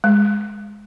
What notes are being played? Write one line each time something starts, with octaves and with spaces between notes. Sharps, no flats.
G#3